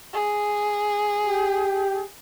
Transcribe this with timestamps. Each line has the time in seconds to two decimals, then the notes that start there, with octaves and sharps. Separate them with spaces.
0.14 G#4
1.21 G4